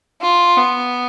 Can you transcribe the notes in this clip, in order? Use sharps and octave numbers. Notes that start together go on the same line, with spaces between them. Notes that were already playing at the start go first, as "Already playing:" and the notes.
F4
B3